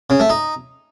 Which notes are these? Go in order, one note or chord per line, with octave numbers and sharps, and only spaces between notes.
C#3
A3
D#4